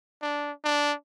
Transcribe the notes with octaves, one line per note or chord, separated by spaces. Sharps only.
D4
D4